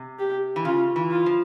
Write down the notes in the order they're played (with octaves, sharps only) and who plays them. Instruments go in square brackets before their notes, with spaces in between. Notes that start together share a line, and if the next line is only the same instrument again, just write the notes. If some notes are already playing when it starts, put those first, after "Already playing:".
Already playing: [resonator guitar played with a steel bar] C3
[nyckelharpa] G4
[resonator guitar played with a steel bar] E3
[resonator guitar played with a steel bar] C#3 [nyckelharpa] F4
[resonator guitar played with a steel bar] E3
[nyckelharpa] F4
[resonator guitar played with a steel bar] F3